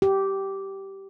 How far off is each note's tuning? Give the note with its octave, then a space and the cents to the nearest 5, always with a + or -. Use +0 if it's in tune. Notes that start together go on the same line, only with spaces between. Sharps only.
G4 -10